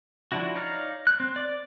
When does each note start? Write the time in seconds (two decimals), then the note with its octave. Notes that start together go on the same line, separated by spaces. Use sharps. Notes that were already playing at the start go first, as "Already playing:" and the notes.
0.32 F3 D4 E4 F#4
0.55 D#4 C#5 D5 F5 A#5
1.07 F#6
1.20 C4
1.36 D5 D6